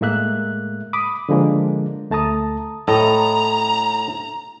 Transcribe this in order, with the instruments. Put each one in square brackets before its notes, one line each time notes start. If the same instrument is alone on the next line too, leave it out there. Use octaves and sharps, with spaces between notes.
[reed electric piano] A2 G#3 A#3 E5 F#6
B5 D6 D#6
D3 F3 G#3 A#3 D4
D2 A3 A5 A#5 D#6
[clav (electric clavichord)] A2 A4 D#5 [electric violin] A#5